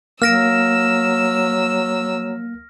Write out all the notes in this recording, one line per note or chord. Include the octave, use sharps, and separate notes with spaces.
F#3 A#3 E6 F6 A#6 D7